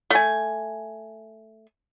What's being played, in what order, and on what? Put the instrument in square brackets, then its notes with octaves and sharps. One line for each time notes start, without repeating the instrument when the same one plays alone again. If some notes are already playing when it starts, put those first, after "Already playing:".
[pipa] A3 G#5